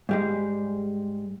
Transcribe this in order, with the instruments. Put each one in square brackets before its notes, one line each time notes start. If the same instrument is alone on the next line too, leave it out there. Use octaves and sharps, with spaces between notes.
[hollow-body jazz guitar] G#2 G3 G#3